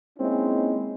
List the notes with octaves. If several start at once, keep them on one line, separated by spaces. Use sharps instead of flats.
G#3 A#3 C4 C#4 D#4 E4